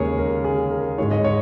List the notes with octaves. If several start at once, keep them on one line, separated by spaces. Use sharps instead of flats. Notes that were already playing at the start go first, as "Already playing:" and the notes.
Already playing: D#2 C#3 G#3 G#4 A#4 C#5
A#4
G#4
A#4
G#2 G#3 D#4 C#5
D#5
C#5